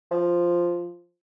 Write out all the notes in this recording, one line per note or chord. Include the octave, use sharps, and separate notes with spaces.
F3